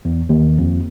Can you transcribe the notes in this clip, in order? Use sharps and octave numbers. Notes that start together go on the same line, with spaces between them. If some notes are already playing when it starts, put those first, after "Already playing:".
E2
D#2
F2